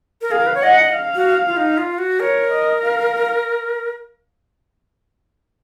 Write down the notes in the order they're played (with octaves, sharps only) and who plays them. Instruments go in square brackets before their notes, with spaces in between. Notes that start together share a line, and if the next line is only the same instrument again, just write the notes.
[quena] A#4
[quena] G#4 [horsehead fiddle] F5
[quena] A#4
B4
C#5
[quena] D#5 [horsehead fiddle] F#5
[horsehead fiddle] F5
[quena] F#4
F4
D#4
F4
F#4
[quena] A#4 [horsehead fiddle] C#5
[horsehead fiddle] D#5
F5